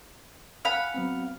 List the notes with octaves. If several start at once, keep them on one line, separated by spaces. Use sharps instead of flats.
F5 F#5 G#5 B5
F#3 B3 C4